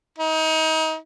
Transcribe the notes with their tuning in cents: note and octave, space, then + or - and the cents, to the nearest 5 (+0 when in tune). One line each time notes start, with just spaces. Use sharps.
D#4 +30